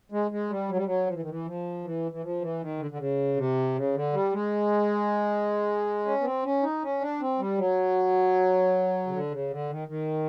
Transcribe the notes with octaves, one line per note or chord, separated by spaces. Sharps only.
G#3
G#3
G3
F#3
G3
F#3
F3
E3
D#3
E3
F3
E3
E3
F3
E3
D#3
D3
D3
C#3
C3
C#3
D3
G3
G#3
C#4
B3
C4
C#4
D#4
C#4
D4
C4
G3
F#3
C#3
D3
C#3
D3
D#3
D#3